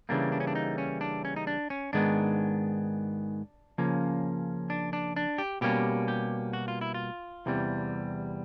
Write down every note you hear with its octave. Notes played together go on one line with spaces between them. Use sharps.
C#3 E3 G3 A#3 D4
D4
C#4
D4
D#4
C#4
D4
C#4
D#4
D4
C#4
G#2 D#3 G#3 B3 D4
C#3 F3 A#3 C#4
D4
D4
D4
G4
B2 G3 A#3 C#4 G4
G4
F#4
F4
E4
F4
E2 C3 E3 G3